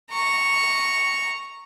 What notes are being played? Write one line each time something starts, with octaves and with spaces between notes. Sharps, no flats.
A#5 C#6